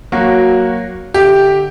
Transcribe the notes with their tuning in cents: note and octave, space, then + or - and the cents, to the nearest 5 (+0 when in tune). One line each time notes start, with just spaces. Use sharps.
F#3 +0 A#3 +0 F#4 -10
D3 +0 G4 +0 E5 +0